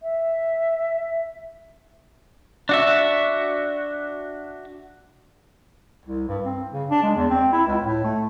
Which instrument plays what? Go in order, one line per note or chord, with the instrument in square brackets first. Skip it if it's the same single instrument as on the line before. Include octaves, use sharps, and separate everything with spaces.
[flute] E5
[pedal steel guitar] D4 F#4 E5
[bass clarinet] C2
G2
C4
C#3
D4
G#3
E2
C4
E4
C#2
A2
A3